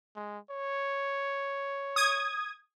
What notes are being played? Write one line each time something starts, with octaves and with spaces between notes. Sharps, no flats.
G#3
C#5
D#6 G#6